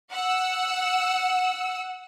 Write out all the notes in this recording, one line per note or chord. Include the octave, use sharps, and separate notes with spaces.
F#5 E6